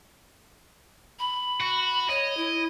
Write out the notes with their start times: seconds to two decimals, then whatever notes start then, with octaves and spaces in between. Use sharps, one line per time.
1.19 B5
1.60 F#4
2.09 C#5 D#5
2.37 E4